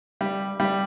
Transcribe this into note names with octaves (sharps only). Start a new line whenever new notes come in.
G3
G3